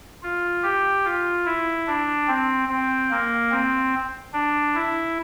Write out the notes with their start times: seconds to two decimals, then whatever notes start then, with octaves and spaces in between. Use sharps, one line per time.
0.23 F4
0.63 G4
1.05 F4
1.45 E4
1.87 D4
2.28 C4
2.69 C4
3.11 A#3
3.52 C4
4.33 D4
4.75 E4